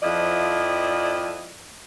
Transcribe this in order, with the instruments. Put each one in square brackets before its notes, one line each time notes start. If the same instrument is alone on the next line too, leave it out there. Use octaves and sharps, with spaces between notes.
[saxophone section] F2 F3 E4 D5 D#5